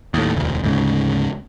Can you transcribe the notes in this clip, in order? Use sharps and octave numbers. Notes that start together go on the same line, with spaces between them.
D#2 A2
E1 D2
D2 G#2 C#3